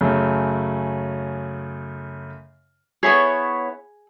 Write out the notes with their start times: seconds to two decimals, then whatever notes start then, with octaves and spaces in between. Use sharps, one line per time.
0.01 F#2 C#3 A3
3.03 B3 E4 G#4 C#5